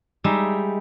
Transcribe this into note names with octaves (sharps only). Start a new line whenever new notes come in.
G3 G#3 D#4 E5